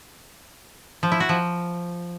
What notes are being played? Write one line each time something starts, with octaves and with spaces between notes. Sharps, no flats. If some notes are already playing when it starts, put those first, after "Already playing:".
F3
E4
F#4
F3